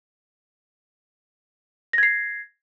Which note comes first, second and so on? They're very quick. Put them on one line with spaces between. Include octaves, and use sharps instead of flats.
A#6 G#6 C7